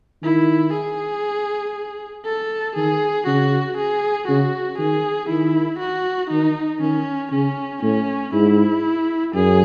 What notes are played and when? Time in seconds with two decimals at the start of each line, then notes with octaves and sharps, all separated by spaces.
0.23 D#3 E4
0.73 G#4
2.25 A4
2.76 D#3 G#4
3.26 C#3 F#4
3.77 G#4
4.28 C#3 F#4
4.78 D#3 G#4
5.29 D#3 E4
5.79 F#4
6.30 D#3 D#4
6.81 D#3 C#4
7.31 C#3 C#4
7.83 A2 C#4
8.33 G#2 E4
9.34 F#2 G#4